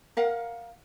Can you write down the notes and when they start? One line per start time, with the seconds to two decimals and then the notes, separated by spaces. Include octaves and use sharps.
0.17 A#4 F5 F#5